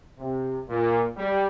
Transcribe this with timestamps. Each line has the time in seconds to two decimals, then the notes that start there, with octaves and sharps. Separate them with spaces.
0.18 C3
0.69 A#2
1.17 G3